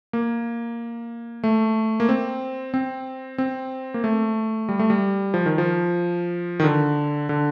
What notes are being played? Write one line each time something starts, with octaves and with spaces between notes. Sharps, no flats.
A#3
A3
A#3
C4
C4
C4
A#3
A3
G3
A3
G3
F3
D#3
F3
D#3
D3
D3